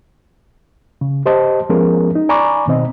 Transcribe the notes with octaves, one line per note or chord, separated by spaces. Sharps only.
C#3
G4 C5 D#5 A5
F3 G#3 B3 C#4 G#4 A#4
D#4
D5 G#5 A#5 B5 C#6 D6
B2 D#3 C4 D#5